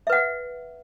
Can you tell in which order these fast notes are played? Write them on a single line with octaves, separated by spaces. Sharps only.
E5 B4 F#5